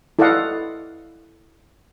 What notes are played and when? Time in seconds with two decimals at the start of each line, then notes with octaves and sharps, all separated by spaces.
0.19 E4 A4 D5 D#5 F5 F#5